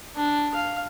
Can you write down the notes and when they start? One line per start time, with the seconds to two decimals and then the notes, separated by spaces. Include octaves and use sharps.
0.16 D4
0.55 F5